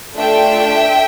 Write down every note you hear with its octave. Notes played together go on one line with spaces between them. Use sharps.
A3 D4 F4 A4 E5 G5